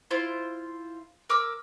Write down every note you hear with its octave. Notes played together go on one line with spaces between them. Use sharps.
E4 F4 C5
A#4 D6 E6